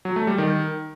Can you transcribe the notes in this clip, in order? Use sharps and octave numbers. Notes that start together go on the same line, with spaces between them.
F#3
A3
G3
D#3